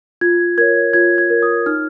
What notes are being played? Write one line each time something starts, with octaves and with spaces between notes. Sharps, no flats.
F4 G#6
A#4 C#5 G#6
F4 G#6
G#6
A#4 C#5
D#6
D#4 F6